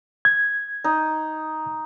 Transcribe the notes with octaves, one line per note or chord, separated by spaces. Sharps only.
G#6
D#4